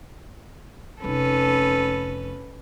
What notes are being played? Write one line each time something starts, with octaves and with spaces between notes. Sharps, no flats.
F1 C#4 D#4 A4 B4